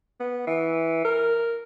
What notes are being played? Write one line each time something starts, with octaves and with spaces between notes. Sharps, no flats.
B3
E3
A#4